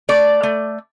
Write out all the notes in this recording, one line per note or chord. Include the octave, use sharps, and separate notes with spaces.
A3 D5
A3